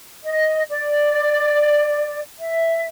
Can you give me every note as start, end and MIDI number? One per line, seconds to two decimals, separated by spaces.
0.25 0.63 75
0.69 2.19 74
2.38 2.86 76